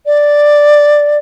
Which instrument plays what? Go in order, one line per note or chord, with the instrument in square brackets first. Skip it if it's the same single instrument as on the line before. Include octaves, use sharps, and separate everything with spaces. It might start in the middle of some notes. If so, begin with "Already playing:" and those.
[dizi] D5